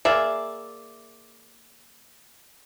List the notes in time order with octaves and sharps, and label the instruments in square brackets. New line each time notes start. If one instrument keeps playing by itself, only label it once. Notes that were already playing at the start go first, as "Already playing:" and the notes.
[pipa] A#3 G#4 D5 E5